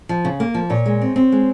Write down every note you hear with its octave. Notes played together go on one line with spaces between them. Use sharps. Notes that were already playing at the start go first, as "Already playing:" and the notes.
F3
C#3
A#3
F3
A#2 C#5
G#3
C4
C4
G#3